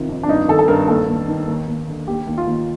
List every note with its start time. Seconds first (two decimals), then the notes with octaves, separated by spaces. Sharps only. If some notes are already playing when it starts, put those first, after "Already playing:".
Already playing: C3 D#3 F4
0.09 F2
0.23 D4
0.29 G2 D#4
0.48 D#3 A4
0.59 A4
0.68 G2 A#4
0.88 D#2 A4
1.08 D#2
1.28 D#3
1.48 D#2
1.68 D#2
1.88 D3
2.07 D#2 G4
2.27 D#2
2.38 F4
2.47 D#2